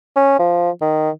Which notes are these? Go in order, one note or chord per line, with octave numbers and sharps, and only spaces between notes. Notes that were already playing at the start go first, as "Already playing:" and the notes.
C#4
F3
D#3